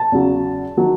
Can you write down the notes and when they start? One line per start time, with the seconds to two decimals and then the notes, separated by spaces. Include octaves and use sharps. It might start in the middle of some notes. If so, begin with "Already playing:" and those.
Already playing: A5
0.12 E2 C#3 F#3
0.77 D#3 F#3